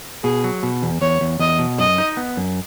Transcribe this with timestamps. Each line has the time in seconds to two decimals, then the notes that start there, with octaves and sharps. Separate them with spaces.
0.24 B2 G#4
0.44 F#3
0.63 B2
0.83 E2
1.01 E2 C#5
1.21 E2
1.39 E2 D#5
1.59 B2
1.79 F#2 D#5
1.98 D#4
2.17 B3
2.37 F#2